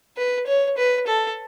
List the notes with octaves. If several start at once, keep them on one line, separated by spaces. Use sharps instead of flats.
B4
C#5
B4
A4